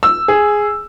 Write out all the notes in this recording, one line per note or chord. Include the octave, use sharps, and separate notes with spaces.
E6
G#4